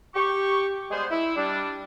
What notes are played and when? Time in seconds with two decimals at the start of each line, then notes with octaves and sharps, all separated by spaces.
0.15 G4 C#6
0.91 G3 G#3 B3 G#4 C5
1.11 E4
1.36 G3 D4